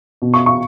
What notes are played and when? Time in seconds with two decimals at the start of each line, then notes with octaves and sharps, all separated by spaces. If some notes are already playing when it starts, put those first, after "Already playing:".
0.22 B2
0.34 C#6
0.46 C#6